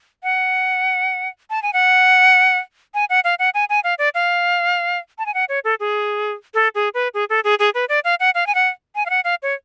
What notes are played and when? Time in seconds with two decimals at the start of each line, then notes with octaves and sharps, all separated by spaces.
0.23 F#5
1.50 A5
1.63 G#5
1.73 F#5
2.94 G#5
3.10 F#5
3.24 F5
3.39 F#5
3.54 G#5
3.69 G#5
3.84 F5
3.99 D5
4.15 F5
5.18 A5
5.26 G#5
5.34 F#5
5.49 C#5
5.64 A4
5.80 G#4
6.54 A4
6.75 G#4
6.94 B4
7.14 G#4
7.30 A4
7.44 G#4
7.59 G#4
7.75 B4
7.89 D5
8.04 F5
8.20 F#5
8.35 F5
8.47 G#5
8.55 F#5
8.95 G#5
9.06 F5
9.10 F#5
9.24 F5
9.43 C#5